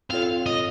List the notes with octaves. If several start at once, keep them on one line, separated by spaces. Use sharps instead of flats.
C4 F4 A4 C#5 F5
D#5